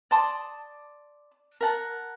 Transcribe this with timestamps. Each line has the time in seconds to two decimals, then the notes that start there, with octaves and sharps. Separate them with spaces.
0.11 D5 A5 C6 D#6
1.61 A#4 F#5 A5